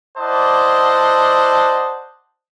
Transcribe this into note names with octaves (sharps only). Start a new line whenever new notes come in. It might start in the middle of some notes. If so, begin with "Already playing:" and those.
E4 C5 D5 D#5 F#5 A5